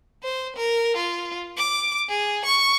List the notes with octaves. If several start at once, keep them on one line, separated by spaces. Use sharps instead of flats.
C5
A#4
F4
D6
G#4
C#6